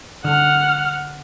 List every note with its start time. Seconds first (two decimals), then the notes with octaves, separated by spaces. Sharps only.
0.24 D3 F#5 F6